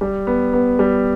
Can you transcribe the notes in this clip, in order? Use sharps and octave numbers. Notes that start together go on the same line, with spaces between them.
G3
B3
B3
G3